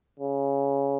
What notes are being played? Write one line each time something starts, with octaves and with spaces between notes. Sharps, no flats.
C#3